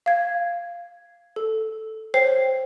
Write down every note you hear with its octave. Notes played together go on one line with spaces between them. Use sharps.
F5 G#6
A4
C5 C#5 G5 C7